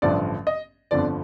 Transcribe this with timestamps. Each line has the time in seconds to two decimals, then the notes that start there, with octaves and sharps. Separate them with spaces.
0.02 A1 G2 D3 F3 D5
0.47 D#5
0.91 G1 F2 D3 F3 D5